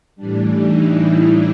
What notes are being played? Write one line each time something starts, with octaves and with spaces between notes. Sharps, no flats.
A2 E3 G3 D4
D#4
E4